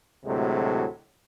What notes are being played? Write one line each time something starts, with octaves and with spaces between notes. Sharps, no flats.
D2 A2 C3 F#3 G#3